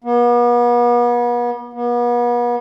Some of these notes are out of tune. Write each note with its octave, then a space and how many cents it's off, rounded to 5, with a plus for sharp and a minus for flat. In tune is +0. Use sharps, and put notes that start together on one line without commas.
B3 -40
B3 -40